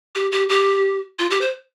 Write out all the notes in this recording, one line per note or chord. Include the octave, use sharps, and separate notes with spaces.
G4
G4
G4
F4
G4
C5